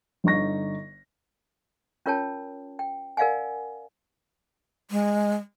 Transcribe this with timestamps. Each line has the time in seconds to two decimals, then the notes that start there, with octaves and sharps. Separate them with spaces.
0.24 G1 D3 D#4 C#6 A#6
2.06 C#4 F4 A#4 C#5 G5 A5
2.79 G5
3.17 A#4 D5 F5 F#5 G#5
4.91 G#3